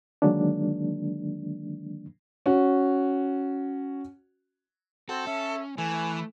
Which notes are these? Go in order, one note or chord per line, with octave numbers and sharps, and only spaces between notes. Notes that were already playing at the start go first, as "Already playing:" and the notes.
D3 D#3 F#3 G#3 A#3 D4
C#4 F#4
C4 F#4 A4
C#4 E5
E3 A3 G#5